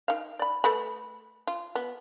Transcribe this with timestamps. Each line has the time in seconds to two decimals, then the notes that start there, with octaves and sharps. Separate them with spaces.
0.08 D#3 F5
0.39 D5 B5
0.64 A3 B4 B5
1.47 F4
1.75 B3